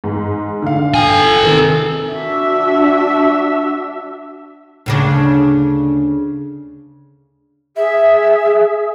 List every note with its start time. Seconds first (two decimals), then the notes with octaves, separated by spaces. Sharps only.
0.04 G#2
0.62 D3 F5
0.94 A4 G5 G#5
1.43 C3 D#3
2.10 D4 F#4 E5
4.86 D2 C#3 D4
7.76 G#4 E5